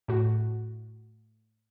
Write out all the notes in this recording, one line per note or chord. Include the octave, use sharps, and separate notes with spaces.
A2 F#4